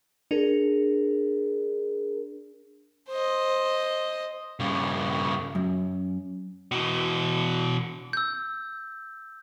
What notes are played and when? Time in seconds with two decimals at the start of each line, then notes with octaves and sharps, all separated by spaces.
0.31 D4 G#4 A#4
3.10 C5 D#5
4.60 G2 C#3
5.55 F#2
6.71 B2 E3
8.13 E6 G6